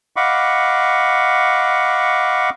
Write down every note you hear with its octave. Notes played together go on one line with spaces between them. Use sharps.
D#5 F5 F#5 B5 C#6 D6